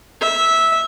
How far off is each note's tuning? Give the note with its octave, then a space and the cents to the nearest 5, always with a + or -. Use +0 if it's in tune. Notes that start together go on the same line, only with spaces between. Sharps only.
E5 -10